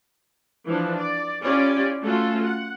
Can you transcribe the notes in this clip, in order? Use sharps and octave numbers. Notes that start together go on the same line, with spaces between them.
E3 F3 D4 E4
D5
C#4 E4 F4 G4 D5
A3 C#4 F4 F#4 A4
F#5